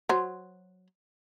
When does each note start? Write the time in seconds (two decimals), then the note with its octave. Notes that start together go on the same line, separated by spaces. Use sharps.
0.09 F#3 C5